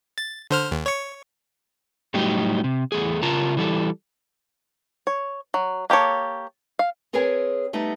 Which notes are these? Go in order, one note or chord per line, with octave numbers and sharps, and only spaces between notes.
A6
D3 C5 F6
D#2
C#5 C#6
A2 F#3 G3 A3 D#4 G4
C3
E2 A3 G#4
C#3 F4 A#4 A5 A#5
E3 G3 A4
C#5
F#3
A#3 G4 A4 C#5
F5
C4 G#4 A#4 B4 C#5 G#5
G3 A3 B3 D#4